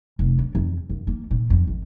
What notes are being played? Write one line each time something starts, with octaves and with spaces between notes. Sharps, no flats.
F1
D4
F2
F#2
A#3
A#2
F2
G#1